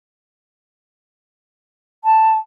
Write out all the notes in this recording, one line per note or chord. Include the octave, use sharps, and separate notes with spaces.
A5